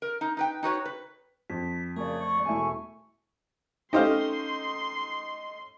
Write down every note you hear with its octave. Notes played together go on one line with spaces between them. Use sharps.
A#4
D#4
D#4 B4 G5
D#4 F#4 B4 C#5
B4
F2 B6
F#2 C#3 A3 C#5 D5
C#6
E1 A3 E4 G#5
A3 C#4 D#4 G4 C5 F5 C6